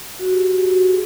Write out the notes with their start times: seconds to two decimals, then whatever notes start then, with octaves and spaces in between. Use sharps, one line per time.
0.19 F#4
0.31 G4
0.43 F#4
0.56 G4
0.68 F#4
0.91 G#4